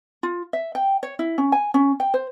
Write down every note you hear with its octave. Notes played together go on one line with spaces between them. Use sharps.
F4
E5
G5
C#5
E4
C#4
G#5
C#4
G5
C5